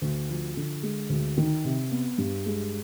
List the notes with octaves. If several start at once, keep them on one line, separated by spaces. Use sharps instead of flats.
D2
F3
D3
G#3
D2
D#3
C3
B3
G2
G#3